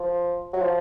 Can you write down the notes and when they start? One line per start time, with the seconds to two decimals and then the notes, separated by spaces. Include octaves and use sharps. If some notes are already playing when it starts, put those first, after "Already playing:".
Already playing: F3
0.53 F#3
0.62 F3